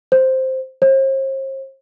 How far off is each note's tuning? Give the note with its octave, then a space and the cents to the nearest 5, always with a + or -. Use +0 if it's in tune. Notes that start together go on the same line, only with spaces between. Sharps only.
C5 +0
C5 +40